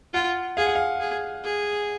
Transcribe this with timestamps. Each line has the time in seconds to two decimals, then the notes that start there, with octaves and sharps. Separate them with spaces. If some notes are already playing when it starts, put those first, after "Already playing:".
0.14 F4 F#5
0.57 G#4 F5
0.66 F#5
0.75 F5
1.00 G#4
1.44 G#4